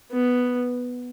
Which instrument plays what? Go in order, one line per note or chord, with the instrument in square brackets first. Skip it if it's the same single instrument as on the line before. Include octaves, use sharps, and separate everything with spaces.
[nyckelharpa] B3